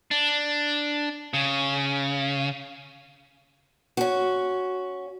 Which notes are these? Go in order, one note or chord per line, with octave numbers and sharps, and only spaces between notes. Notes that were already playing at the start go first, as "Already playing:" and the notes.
D4
C#3
C#4 F#4